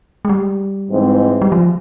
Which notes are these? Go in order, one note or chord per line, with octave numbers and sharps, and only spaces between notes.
G#3
G3
G#2 E3 G#3 C4
G3
F3